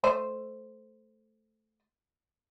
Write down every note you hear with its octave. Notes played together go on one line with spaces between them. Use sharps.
A3 C5 D#5